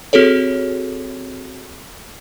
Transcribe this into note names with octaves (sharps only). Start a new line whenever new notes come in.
C4 F#4 G#4 A4 C#5